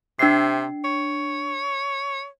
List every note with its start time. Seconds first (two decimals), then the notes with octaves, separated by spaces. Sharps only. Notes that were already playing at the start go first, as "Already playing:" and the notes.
0.19 C3 D4 C7
0.84 C#5